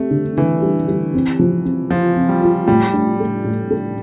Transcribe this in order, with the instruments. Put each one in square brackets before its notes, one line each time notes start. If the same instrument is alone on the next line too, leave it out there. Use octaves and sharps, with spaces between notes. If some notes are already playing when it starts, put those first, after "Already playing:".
Already playing: [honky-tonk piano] G3 C4 [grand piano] A3
[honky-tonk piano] D3
[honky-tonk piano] D3 [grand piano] E3
[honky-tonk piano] G3
G3
C4
F3
C4
[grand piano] F3 [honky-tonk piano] F4
[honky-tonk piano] C4
[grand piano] G3
[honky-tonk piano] F4
[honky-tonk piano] A2 [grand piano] G3
[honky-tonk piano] D4
A3
A2
A3